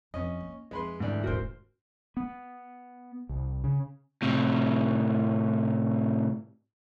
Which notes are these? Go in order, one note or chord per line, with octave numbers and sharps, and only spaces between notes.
F2 C#4 D#5
A#3
F2 G#3 B4 C6
D2 G#2 E3 D5
D#1 G#2 F#4 A#4 C5
B3
C2
C#3
A2 C3